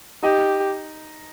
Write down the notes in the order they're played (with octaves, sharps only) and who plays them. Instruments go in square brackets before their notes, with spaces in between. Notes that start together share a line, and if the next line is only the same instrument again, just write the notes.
[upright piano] D#4 D#5 [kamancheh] G4